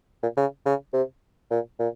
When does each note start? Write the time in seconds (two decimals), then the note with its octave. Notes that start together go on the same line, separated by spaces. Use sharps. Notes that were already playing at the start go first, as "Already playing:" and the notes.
0.23 A#2
0.37 C#3
0.66 C#3
0.93 C3
1.51 A#2
1.79 A#2